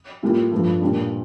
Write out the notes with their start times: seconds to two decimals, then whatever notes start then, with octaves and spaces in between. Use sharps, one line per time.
0.23 A2 G3 A#3 F4
0.52 G2 F3 A3
0.81 A#2 G3 D4